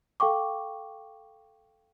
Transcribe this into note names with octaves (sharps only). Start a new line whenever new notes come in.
A4 F5 G5 C#6 D6